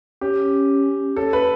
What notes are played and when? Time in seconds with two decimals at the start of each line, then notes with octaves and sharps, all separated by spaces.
0.21 C#4 G4
1.16 C#4 A4
1.33 B4